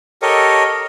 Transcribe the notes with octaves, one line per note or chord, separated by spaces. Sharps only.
G4 A4 A#4 C#5 D#5